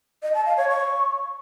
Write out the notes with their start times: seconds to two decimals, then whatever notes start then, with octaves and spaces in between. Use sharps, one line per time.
0.23 D#5
0.34 A5
0.46 F5
0.57 C#5
0.69 C#6